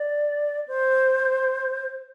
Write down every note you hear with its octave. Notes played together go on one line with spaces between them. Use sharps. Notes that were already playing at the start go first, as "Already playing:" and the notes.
Already playing: D5
C5